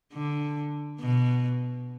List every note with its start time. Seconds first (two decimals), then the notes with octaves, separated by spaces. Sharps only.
0.13 D3
1.01 B2